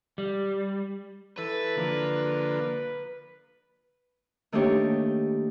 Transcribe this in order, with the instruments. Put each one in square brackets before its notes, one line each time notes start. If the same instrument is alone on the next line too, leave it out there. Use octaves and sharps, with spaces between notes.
[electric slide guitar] G3
[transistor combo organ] E3 A4 [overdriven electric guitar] B4
[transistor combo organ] D3 F3 A#3
[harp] D#3 A3 A#3 D4 G4 C#5